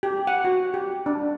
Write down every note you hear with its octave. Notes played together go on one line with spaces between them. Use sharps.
G4
F#5
F#4
G4
D4